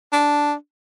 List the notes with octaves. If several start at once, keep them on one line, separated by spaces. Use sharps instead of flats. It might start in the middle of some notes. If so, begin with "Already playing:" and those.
D4